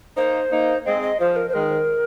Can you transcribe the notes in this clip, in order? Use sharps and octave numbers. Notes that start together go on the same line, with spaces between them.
A#3 D#4 C5
A#3 D#4
G#3 C4 D#5
D#5
F3 C5
A#4
C5
D#3 G#3 A#4